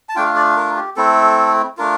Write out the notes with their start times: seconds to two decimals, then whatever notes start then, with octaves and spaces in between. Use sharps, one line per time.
0.09 A5
0.15 A3 D4 F4 G5
0.26 F5
0.36 D5
0.56 A#4
0.76 G4
0.96 A3 C4 E4 A4
1.77 A3 D4 F4 A#4